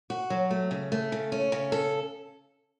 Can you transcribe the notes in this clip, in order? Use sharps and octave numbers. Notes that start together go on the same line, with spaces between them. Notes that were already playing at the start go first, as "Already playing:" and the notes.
F#4
F#3
A3
C#3
A3
C#3
C#4
C#3
A4